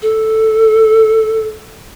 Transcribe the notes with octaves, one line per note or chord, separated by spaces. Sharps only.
A4